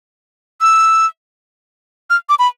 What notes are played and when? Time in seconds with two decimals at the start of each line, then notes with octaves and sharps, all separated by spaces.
0.61 E6
2.10 F6
2.29 D6
2.39 B5